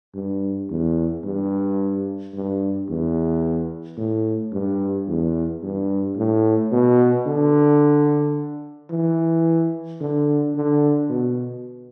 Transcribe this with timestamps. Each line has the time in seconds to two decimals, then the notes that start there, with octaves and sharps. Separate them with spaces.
0.15 G2
0.70 E2
1.24 G2
2.34 G2
2.89 E2
3.98 A2
4.53 G2
5.08 E2
5.63 G2
6.17 A2
6.72 B2
7.26 D3
8.91 E3
10.01 D3
10.55 D3
11.10 B2